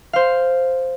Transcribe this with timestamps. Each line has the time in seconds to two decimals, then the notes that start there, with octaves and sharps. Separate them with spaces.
0.13 C5 F5